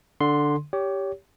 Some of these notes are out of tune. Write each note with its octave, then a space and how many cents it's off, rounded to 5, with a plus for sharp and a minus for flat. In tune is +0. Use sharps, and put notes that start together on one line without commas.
D3 +0 C6 +0
G4 +0 C#5 +25